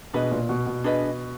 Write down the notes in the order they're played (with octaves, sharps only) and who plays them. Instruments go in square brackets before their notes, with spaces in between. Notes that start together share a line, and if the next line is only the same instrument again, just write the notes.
[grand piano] B2 [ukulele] D4 G#4 B4 D#5
[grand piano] A#2
B2
B2
[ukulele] D4 G#4 B4 D#5